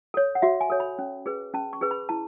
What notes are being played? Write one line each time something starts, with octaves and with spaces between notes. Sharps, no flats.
A4 C#5
F#5
F#4 E5
G#5
A4 C#5
B5
C#4
G#4 B4
C#4 A5
C#6
G#4 B4
B5
E4 A5